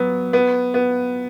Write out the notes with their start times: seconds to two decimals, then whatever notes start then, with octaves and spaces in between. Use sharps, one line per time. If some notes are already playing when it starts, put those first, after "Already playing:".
Already playing: F#3 B3
0.33 B3
0.74 B3